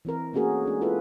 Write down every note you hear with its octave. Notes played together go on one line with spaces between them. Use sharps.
E3 C4 A#4
A3 A#3 C#4 F#4 G#4 A#4
G#3 D4
E4 F4 G#4 A4 B4 E5